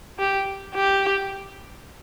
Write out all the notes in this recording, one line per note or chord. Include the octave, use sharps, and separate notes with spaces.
G4
G4